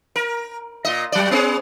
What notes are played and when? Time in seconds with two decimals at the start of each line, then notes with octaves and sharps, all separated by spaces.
0.16 A#4
0.85 A#2 D#5
1.12 F#3 D5
1.31 B3 C#4 G#4